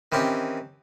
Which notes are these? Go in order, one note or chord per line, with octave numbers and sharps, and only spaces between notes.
D#3 E3 C4 C#4 G4